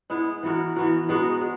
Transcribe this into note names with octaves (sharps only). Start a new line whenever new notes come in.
G#3 B3 E4
E3 B3 F#4 A#4
E3 B3 F#4 A#4
G#3 B3 D#4 F#4
G#3